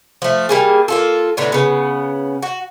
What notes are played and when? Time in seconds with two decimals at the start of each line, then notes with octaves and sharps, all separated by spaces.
0.22 F3 A3
0.49 G3 A#3 G#4
0.88 A#3 F4 A4
1.37 A2 D3 B3 A#5
1.52 C#3 B3
2.42 F#4